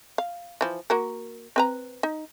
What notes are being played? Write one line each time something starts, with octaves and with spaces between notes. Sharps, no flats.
F5
E3 F3
A#3 F#4 A#4
C4 B4 A#5
D#4